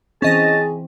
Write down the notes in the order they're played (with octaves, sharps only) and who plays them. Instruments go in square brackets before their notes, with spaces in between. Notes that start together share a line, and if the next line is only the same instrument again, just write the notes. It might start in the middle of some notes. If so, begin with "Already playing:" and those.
[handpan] E3 C4 [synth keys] C#4 D#5 A#6 [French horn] G#4 [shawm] A5